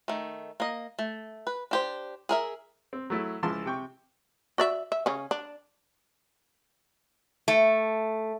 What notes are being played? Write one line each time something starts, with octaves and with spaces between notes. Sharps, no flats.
D#3 A3
A#3 D#5
A3
B4
D4 G4 C5
G#4 A#4 E5
C4
F#3 A3 E4
C#2 F3 E4 A5 C6 E6
C3 G5 C#6
F#4 D5 E5
E5
C#3 C#4
D4
A3